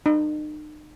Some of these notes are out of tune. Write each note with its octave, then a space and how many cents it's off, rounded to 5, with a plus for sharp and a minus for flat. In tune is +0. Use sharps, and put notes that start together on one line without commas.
D#4 -40